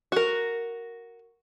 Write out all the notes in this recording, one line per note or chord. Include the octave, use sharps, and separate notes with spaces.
F#4 A#4